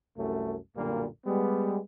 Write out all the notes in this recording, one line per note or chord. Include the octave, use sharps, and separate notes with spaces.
C2 F#2 A3
B1 F#2 A#2 D3 G3 A#3
G3 G#3 B3